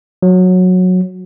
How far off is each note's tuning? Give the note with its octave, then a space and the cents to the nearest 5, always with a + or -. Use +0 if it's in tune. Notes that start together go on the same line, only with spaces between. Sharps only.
F#3 -15